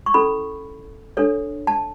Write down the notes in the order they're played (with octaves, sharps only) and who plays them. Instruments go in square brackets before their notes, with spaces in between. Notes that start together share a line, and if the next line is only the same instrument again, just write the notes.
[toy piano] C#6
C#4 E4 A4 B5
D4 A4 C#5
A5